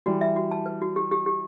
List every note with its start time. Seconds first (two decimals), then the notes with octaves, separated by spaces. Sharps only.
0.06 E3 G3 F#4
0.21 E5
0.36 F#4
0.51 A5
0.66 B4
0.82 F#4
0.96 G4
1.11 G4
1.26 G4